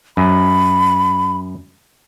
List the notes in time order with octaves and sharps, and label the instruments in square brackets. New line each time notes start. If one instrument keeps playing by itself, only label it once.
[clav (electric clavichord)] F#2 [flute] B5